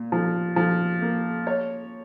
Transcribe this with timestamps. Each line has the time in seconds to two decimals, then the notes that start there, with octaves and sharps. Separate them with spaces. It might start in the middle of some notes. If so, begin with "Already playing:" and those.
Already playing: A#2
0.12 F3
0.56 F3
1.02 A#3
1.47 C#5